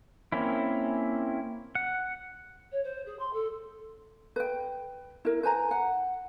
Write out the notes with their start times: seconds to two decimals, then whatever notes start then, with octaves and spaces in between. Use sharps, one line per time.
0.32 A#3 C4 C#4 E4
1.75 F#5
2.71 C#5
2.84 C5
3.05 G#4
3.19 C6
3.33 A4
4.36 B4 G5
5.25 E4 A#4
5.43 B4 C5 G#5 A#5
5.71 F#5